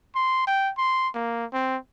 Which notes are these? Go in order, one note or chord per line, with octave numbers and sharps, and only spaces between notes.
C6
G5
C6
A#3
C4